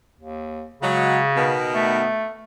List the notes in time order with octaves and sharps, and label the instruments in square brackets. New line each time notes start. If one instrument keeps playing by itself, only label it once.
[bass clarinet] D#2
[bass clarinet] C#3 [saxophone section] F#3 G#3
[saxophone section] B2 D#3 B3
[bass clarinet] A3